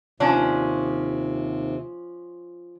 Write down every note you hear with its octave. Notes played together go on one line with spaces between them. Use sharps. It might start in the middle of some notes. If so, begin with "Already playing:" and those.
D#2 C3 F3 C#4 D4